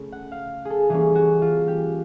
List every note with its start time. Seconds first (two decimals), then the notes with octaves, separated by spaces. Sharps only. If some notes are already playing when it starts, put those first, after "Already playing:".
Already playing: C#3 A3 C#4
0.12 F#5
0.32 F5
0.65 G#4
0.70 A4
0.89 E3 G3 A#3 C#4 G#4
1.15 F#4
1.42 F4
1.68 G4